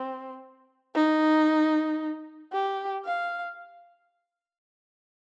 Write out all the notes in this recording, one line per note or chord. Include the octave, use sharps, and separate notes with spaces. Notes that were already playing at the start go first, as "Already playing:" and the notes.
Already playing: C4
D#4
G4
F5